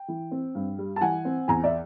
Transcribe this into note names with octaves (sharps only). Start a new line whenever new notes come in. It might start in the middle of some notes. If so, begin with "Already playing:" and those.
Already playing: G5
E3
C4
G2
G3
A5
E3 F#5 G#5
C4
E2 G#5 A#5
D5 E5